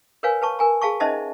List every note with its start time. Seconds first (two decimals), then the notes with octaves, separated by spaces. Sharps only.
0.23 A#4 B4 C#5 F5 G#5
0.42 B4 A5 C#6
0.59 A#4 G#5 A#5
0.82 G#4 F5 A5 C#6
1.00 C#4 D#4 C5 D#5 E5 A5